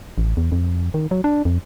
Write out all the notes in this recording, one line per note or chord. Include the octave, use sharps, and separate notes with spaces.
A1
E2
F2
D#3
F#3
D4
F2